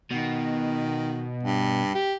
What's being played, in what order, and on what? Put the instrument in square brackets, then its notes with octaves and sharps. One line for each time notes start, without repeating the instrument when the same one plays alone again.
[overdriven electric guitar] B2 [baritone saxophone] D#3
[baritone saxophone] G2
G4